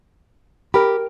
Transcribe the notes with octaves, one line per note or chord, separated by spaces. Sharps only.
G4 A#4 B5